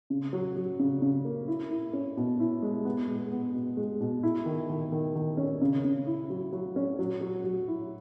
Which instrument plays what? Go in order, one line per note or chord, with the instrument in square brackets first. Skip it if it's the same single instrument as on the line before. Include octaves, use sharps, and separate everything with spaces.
[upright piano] C#3
F#3
F#3
C#3
C#3
A#3
E4
E4
C#4
B2
E4
G#3
B3
G#3
B3
B2
G#3
B2
E4
D#3
D#3
D#3
D#3
C#4
C#3
C#3
E4
F#3
F#3
C#4
F#3
F#3
F#3
E4